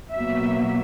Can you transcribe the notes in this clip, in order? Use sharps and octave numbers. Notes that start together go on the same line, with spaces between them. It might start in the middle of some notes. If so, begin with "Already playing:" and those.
B2 F#3 A#3 E5